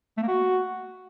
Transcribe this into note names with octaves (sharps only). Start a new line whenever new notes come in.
A3
A#3
F#4